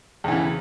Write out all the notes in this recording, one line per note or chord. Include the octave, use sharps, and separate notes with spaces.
E2 C#3 E3